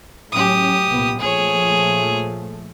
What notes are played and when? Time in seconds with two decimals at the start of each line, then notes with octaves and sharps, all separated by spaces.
0.32 A2 F#3 C#4 G4 D#6
0.87 C2 A#2 B3
1.19 A#2 F3 A3 G#4 C#5